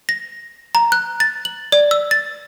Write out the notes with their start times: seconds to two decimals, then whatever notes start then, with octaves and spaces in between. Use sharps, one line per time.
0.09 A#6
0.75 A#5
0.92 F#6
1.20 A6
1.45 F#7
1.72 D5
1.91 E6
2.11 A6